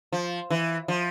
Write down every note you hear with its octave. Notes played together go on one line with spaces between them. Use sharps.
F3
E3
F3